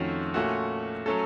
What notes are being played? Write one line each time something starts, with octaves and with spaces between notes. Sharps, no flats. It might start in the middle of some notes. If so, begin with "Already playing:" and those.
Already playing: F2 D#3 A3 C#4 F#4
A#2 A3 C#4 F#4
F#3 A3 C#4 A4